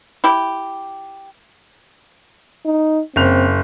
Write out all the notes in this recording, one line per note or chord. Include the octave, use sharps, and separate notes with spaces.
E4 G4
D#4
F#1 C4 F7